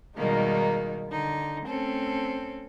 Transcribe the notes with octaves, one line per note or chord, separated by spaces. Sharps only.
B2 D#3 G3 G#3 A#3 D#4
D3 D#4
A3 C4 C#4 A4